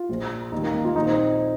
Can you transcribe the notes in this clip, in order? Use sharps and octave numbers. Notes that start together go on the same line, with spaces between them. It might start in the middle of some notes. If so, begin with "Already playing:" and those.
Already playing: F4
A#1 A#2 F3
D#2 D#3 D#4
A#3
A#3
F4
A#1 A#2 F3 D#4
C4